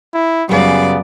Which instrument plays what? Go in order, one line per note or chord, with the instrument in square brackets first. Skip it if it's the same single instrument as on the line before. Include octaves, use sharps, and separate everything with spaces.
[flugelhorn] E4
[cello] F#2 D5 [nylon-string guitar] C#3 G3 [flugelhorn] B3